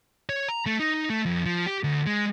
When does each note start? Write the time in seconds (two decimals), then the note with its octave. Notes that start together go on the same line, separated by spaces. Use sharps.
0.29 C#5
0.48 A#5
0.66 A3
0.80 D#4
1.10 A3
1.26 F2
1.46 F3
1.66 G4
1.84 D2
2.06 G#3